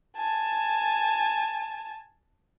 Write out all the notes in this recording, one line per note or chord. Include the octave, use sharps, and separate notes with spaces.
G#5 A5